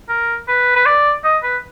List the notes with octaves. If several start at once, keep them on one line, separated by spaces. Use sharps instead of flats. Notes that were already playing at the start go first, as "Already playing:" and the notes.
A#4
B4
B4
D5
D#5
B4